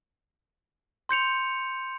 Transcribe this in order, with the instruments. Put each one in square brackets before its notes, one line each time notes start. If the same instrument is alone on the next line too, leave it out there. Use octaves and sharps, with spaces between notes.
[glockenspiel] C6 G6 C#7 F7